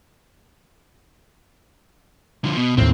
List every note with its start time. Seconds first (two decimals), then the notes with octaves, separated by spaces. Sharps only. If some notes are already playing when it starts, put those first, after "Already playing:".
2.44 D3 F3
2.57 B2
2.78 D#2 A2 C4